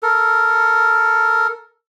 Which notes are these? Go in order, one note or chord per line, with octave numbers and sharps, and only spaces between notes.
A4 A#4